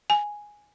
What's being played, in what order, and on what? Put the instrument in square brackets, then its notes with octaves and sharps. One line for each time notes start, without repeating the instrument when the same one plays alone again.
[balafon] G#5